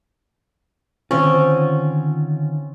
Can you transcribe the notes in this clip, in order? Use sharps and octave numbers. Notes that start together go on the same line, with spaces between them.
D3 D#3 C4 C#4 F4